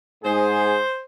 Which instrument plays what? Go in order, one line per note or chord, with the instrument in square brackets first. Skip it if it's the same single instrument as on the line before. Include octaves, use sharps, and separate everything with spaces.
[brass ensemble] G#2 G#4 [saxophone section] C5